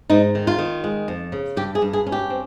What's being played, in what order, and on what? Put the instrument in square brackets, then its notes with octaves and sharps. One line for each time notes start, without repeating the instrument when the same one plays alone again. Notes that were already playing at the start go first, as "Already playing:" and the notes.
[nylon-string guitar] G#2 D#4
D#3
F4
D#3
G#3
F2
C#3
G2 G4
G#4
G2
G#4
C#4
G4
C4